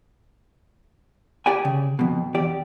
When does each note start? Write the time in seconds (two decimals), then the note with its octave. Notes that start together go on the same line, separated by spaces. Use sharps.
1.46 G4 D5 G5 G#5
1.65 C#3
1.99 F2 B2
2.34 E2 G4 D5